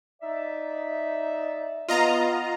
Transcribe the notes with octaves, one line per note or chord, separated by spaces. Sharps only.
D#4 D5 E5
B3 F4 D#5 A#5